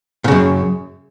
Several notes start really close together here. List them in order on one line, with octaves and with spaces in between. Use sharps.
A#2 C#3 F#2